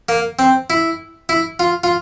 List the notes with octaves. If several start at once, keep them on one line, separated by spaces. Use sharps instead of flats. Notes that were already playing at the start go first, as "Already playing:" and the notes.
A#3
C4
E4
E4
F4
F4